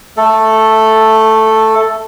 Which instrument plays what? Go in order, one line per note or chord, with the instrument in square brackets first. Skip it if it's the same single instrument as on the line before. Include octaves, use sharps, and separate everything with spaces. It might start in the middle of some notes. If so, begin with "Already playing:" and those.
[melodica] A3 A4